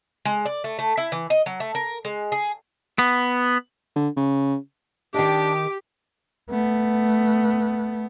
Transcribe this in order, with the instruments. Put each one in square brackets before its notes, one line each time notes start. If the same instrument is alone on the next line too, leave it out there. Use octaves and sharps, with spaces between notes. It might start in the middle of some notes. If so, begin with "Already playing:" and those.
[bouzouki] G#3
D5
A3
A3
E4
E3
D#5
F#3
A3
A#4
G#3
G#4
[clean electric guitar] B3
[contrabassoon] D3
C#3
[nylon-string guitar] D#3 D#5 [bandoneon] D4 [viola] G4 [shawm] D6
[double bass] A3 B3